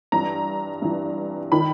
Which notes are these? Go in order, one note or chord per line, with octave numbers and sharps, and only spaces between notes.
G2 E3 A#5
G2 E3
D#3 B5